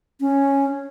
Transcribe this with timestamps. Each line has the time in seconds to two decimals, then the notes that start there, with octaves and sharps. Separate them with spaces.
0.21 C#4